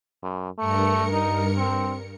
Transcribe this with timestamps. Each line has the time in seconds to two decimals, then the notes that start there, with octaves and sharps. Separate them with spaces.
0.23 F#2
0.58 G2 A3 A#4 C#7
1.13 D#4
1.57 C4